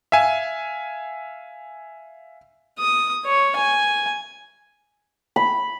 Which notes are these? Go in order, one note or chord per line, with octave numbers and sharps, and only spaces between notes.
E5 F5 G#5
D#6
C#5
G#5
B5